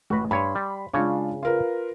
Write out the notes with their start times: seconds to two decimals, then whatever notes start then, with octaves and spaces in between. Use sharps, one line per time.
0.10 A1 F#4 B4
0.31 G2 C#5 B5 C6
0.55 G3
0.93 C#3 G#3 D4 F4 C#5
1.43 F4 A#4 B4